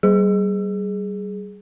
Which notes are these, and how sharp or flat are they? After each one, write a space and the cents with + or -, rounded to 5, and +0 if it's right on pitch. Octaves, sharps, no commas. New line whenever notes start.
G3 -25 G#4 +5